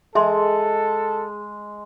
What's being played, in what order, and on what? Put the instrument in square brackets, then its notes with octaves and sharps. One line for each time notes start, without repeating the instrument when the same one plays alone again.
[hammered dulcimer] G#3 [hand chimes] G#4 [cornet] A4 [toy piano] E5 C6